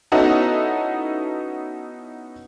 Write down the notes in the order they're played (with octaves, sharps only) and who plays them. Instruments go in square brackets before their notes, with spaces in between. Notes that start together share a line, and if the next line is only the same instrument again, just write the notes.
[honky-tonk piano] B3 C#4 D#4 E4 F#4 A4